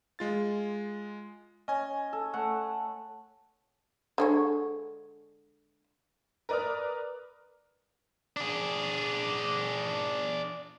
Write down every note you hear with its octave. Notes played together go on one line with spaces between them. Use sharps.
G#3 F4 A6
C#4 D#5 G#5
A4
A3 F#5
D3 G#3 C#5
A#4 B4 D5 D#6 F6
D4 G#4